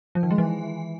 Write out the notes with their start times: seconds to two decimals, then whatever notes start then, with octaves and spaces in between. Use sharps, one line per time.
0.15 F3
0.23 D#3
0.31 G#3
0.38 E3